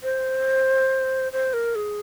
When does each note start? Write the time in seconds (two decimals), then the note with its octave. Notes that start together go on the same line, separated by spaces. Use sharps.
0.03 C5
1.33 C5
1.53 A#4
1.75 G#4